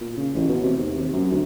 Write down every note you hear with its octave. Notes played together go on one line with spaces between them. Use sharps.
A#2
C#3
A1
B2
C3
D#2
C3
F#2
D2